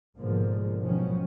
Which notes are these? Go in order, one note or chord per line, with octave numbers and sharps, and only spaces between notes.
G#2 B2 D3 F3 G#3 A#3
G#2 B2 D#3 F3 F#3 C#4